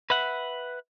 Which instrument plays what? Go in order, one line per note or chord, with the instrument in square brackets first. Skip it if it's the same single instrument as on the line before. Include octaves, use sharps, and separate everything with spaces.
[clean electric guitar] B4 E5 F#5